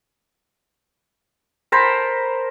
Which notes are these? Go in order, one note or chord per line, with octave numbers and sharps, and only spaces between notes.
A#4 C5 A5 B5